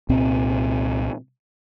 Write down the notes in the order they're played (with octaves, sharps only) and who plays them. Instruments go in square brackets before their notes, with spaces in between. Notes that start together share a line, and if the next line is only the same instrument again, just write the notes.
[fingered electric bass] C2 A#2 C4